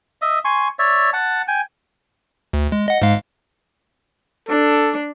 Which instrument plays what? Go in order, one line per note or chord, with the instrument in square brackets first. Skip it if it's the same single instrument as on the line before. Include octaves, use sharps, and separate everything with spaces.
[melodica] D#5 E5
G#5 C6 C#6
C#5 D5 E5
F#5 A5
G5 G#5
[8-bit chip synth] D2
G#3
D#5 F#5
G#2 G#3 F5
[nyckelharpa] D4 [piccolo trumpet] A4